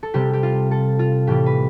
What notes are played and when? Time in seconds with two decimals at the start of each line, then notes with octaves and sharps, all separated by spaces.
0.03 A4
0.14 C3 G3 G4
0.33 G4
0.43 F4
0.71 A4
0.99 F4
1.27 A2 E3 G3 G4
1.46 B4